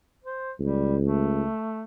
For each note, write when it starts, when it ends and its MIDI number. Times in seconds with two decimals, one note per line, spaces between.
0.24 0.51 72
0.60 1.44 37
0.60 0.95 55
1.01 1.84 57